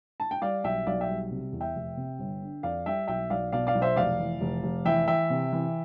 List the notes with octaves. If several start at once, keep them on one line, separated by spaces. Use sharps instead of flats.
A5
G5
G3 D5 F5
B1 E5 G5
B1 D5 F5
E5 G5
G3
C3
E2
E5 G5
F1
C3
G1
D3
F2 D5 F5
G3 E5 G5
B1 E5 G5
B1 D5 F5
B2 D5 F5
D5 F5
B1
C5 E5
F1 D5 F5
E3
F1
F1
E3 E5 G5
E3 E5 G5
C3
E3